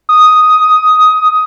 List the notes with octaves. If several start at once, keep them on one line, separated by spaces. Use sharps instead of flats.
D#6